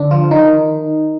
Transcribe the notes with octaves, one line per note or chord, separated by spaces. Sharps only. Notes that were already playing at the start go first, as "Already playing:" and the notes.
Already playing: D3 D4
F3 F4
D#3 D#4